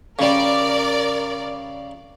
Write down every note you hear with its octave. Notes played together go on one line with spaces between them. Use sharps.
C#3 G3 A#4 D5